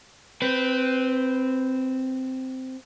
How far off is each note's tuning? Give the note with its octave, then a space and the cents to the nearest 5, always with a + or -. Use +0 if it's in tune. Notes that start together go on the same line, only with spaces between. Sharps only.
C4 -5 B4 +15